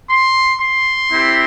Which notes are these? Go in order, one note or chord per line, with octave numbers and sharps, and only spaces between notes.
C6
C6
C4 E4 G4